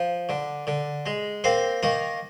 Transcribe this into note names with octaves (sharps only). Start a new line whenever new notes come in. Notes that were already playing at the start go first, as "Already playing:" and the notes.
Already playing: F3
D3
D3
G#3
A#3 C4 C5
D#3 A#3 A#4